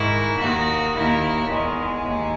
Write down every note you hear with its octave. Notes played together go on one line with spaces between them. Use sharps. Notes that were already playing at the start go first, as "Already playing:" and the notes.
Already playing: G#2 D#3 E4
D#2 D#3 F#4
D#2 D#3 E4
E2 D#3 G#3
D#2